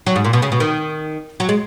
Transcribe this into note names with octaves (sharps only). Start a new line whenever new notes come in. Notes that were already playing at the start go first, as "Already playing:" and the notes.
F#3
G#2
A#2
B2
C#3
B2
D#3
F#3
G#3